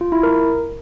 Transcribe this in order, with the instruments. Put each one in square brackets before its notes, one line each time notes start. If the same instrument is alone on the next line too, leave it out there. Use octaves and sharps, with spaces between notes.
[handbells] F4
E4
A#4